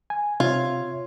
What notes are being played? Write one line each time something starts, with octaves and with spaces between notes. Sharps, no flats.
G#5
C3 F4 C#5 E5 G#6